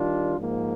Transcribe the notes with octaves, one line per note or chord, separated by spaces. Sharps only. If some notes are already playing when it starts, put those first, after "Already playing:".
Already playing: D#3 G3 D4 F4
G#2 F3 A#3